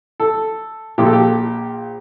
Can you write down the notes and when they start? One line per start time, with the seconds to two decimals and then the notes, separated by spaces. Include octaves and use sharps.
0.20 A4
0.98 A#1 A#2 F3 G4
1.05 A4
1.13 G4